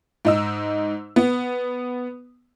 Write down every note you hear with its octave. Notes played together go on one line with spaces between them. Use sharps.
G#2 D#4 E6
B3